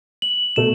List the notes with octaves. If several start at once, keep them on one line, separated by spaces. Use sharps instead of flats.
F#7
B2 A3 E7